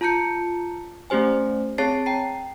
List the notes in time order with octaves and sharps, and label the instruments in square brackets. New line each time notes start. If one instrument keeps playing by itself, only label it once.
[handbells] F4 A5 A#5 G6 C#7
A3 C#4 G4 C5 G#5
C4 G#4 C#5 A5 A6 C7
G5 A#5 C7